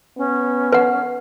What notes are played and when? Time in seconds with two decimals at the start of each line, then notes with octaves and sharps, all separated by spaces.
0.18 B3 C#4
0.72 B4 F#5